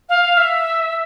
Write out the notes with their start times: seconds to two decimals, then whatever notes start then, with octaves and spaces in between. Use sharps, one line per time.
0.09 F5
0.37 E5